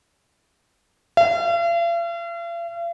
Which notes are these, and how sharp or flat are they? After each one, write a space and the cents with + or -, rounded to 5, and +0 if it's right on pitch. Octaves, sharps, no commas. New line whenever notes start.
F5 -45